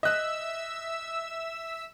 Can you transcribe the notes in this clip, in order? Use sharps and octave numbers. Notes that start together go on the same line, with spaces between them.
D#5 E5 E6 F#6